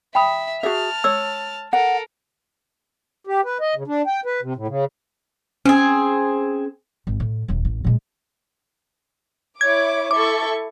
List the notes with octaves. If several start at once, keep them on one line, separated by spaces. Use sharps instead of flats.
E5 G5 B5 D#6
F#4 G#4 E5 A5 F6
C#5 E6
A4 A#4 F#5
G4
B4
D#5
C#3
D4
G5
B4
C3
A2
C#3
C4 C#4 G#4
G#1
A2
D#1 D#2
A1
A#2 G#3
E4 C#5 D6 G#6
E4 A4 C#6 D6